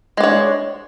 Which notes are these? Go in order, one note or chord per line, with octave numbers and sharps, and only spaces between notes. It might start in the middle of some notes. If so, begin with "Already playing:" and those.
G#3 D4 C#5